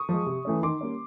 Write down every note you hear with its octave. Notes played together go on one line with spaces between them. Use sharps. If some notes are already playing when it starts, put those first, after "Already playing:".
Already playing: C#6 D#6
F3 G#3
C3
E3 A3 C#4
D#3 C6 D6
G3 A#3 C#4